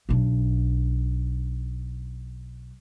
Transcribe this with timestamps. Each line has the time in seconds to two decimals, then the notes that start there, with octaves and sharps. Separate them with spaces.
0.09 B1 D4